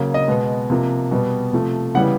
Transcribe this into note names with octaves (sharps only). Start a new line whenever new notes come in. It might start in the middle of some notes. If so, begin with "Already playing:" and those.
Already playing: C#3 F#3 A#3
D#5
B2 G#3 B3
C3 F3 A#3
B2 G3 B3
C3 F3 A3
C#3 E3 G3 B3 F#5